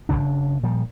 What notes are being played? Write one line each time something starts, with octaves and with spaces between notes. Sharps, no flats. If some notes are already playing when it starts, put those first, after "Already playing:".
F#1 D#2 C#3 D4
A#2 F3 G3